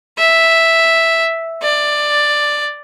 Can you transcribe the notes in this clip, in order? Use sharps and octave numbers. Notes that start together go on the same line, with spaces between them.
E5
D5